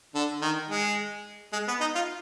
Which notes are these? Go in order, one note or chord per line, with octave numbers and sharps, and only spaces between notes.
D3
D#3
G#3
G#3
B3
D#4
F4